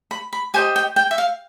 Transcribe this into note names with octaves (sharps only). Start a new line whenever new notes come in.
B5
B5
G4 C5 D#5 G#5
G5
G5
E5
F5